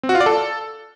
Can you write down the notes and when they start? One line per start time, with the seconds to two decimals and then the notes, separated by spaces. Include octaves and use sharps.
0.03 C4
0.09 F#4
0.15 F4
0.21 D5
0.26 A4